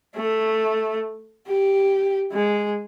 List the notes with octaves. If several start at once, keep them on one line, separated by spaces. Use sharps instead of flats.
A3
G4
G#3